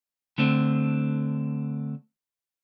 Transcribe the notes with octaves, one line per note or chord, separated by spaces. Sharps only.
D3 A3 C4 D4